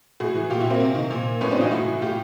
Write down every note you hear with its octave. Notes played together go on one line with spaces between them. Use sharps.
A2 F#4 G#4
E3
A#2 F4 G4
E4 F#4
A#3 C4
C3
D#3
A#2
A2 B3 C#4
C4 D4
E3 D#4 F4
A2 E4 F#4
E3
A2 F4 G4